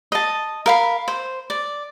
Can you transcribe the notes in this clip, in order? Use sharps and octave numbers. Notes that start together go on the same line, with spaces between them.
D#5 A5
A#4 F5 B5
C5
D5